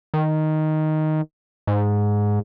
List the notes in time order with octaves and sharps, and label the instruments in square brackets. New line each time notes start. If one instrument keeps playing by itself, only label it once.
[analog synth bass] D#3
G#2